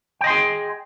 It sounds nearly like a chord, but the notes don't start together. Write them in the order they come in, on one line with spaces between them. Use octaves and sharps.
G5 D#5 C6 G#4